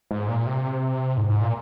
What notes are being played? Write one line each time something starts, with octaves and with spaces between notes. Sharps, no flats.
G#2
A#2
C3
G#2
G#2
A#2